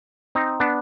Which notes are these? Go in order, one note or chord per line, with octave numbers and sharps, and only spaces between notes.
C4 D#4
B3 D4